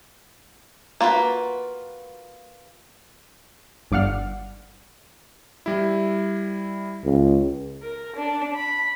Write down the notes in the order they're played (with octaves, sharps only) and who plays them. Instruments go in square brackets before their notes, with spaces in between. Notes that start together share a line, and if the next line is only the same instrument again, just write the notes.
[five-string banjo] A#3 F4 F#4 B4
[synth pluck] G1 G2 D5 F5 F#5 F6
[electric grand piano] G3 E4
[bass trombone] C#2
[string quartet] A#4
D4
B5